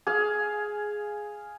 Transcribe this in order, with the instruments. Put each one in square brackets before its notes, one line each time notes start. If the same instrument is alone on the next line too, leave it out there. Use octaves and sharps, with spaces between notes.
[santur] G#4 F5